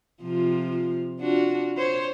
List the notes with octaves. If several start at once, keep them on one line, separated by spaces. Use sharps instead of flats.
C3 F3 F4
D4 F4 F#4
C5 C#5